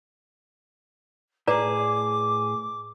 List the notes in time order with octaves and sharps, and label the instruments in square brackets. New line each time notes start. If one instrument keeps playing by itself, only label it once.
[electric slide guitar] A2 G#4 [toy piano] B4 D5 A#5 [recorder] D6